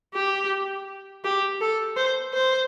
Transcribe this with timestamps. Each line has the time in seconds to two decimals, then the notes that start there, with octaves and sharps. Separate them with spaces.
0.14 G4
1.24 G4
1.61 A4
1.97 C5
2.34 C5